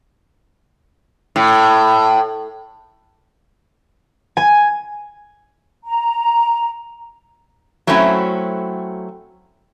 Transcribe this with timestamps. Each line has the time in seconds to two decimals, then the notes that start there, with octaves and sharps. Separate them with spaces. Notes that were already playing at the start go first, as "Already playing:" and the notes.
1.36 A2
4.37 G#5
5.85 A#5
7.87 F#3 A3 C4 C#4 E4 F#4